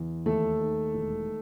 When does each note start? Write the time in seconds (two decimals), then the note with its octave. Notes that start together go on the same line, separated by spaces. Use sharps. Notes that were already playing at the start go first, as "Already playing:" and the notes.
Already playing: E2
0.26 D#2 A3 A4
0.60 D#3
0.94 E1